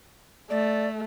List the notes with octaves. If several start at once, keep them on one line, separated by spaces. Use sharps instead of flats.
A3 D5